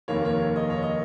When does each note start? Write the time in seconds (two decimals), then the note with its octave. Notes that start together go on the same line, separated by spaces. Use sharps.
0.08 F1 D#2 D#3 A#3 C#5
0.25 C#5
0.56 D#5
0.70 C#5
0.83 D#5